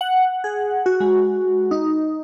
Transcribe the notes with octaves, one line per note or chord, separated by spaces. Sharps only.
F#5
G#4
F#4
G#3
D#4